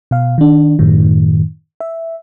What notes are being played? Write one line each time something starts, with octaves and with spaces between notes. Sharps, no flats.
B2 F5
D#3 D4
F#2 A2 D#3
E5